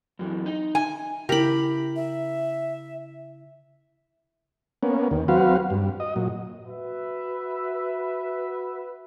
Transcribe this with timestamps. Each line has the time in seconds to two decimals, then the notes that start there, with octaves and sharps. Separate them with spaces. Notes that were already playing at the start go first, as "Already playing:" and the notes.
0.19 F#2 E3
0.46 D#4
0.75 G#5
1.29 C#3 E4 G4 A#4 B5
1.96 E5
4.83 A#3 B3 C#4
5.11 D#2
5.28 F#3 C4 F#4 B4 F5
5.70 G2
6.00 D#5
6.16 A#2 F#3
6.67 F#4 B4 E5